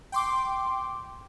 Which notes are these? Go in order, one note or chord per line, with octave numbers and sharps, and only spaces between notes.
G5 C6 D6